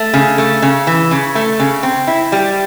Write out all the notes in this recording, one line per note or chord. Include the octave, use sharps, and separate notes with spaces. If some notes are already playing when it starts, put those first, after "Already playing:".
Already playing: A3
C#3
A3
C#3
E3
C#3
A3
C#3
C4
E4
G3